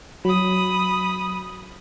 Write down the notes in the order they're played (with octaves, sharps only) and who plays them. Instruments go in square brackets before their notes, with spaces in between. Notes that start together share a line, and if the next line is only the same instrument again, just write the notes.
[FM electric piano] F#3 [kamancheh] B5 D#6